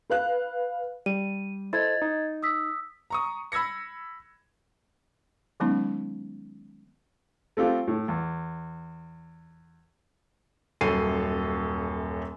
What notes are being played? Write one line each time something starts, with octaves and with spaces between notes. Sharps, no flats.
B4 F5 F#6
G3 D#7
E4 A4 C5 D#5 G#6 A6
D#4
D#6 E6 B6
A#5 C#6 D#6
B5 E6 G#6 A#6 C#7
D#3 F#3 G#3 B3 C#4 D#4
A3 C4 F4 G4
A2
E2
D#1 F#2 A4 C7 D#7